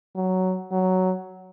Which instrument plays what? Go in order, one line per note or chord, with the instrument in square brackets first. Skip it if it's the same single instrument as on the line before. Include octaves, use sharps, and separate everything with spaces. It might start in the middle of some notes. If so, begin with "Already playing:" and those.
[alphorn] F#3
F#3